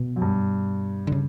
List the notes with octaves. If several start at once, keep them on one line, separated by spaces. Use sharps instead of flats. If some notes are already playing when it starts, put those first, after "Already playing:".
Already playing: B2
F#2
G2
D3
C#3